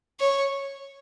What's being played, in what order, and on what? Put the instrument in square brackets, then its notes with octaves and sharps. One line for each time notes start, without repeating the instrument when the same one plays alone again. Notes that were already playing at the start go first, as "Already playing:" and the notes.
[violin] C#5